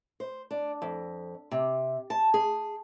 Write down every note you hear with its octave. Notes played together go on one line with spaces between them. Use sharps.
C5
D4
F2
C3
A5
G#4